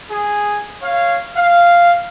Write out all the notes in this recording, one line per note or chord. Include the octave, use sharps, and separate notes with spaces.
G#4
C#5 F5
F5